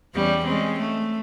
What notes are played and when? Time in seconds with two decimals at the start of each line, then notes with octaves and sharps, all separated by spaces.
0.14 E2 G3 C#4
0.43 G#3 C4 C#4
0.79 A3